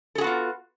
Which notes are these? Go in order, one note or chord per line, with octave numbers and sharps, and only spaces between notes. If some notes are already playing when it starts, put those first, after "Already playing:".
B3 F4 F#4 G#4 A4